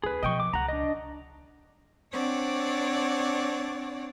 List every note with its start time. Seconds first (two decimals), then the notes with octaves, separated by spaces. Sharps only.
0.04 D2 G#4 B4
0.23 B2 F3 D#5 G5 C#6
0.40 D6
0.53 C#2 F#5 A#5
0.68 D4 D#5
2.12 C4 D4 C#5 D5 F#5